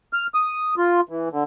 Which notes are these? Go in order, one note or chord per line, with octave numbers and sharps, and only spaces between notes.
F6
D#6
F4
E3
D3